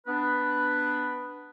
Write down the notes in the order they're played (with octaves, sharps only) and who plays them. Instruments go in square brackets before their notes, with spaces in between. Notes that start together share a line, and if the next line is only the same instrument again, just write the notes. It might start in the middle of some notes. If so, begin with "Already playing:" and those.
[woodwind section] B3 D4 B4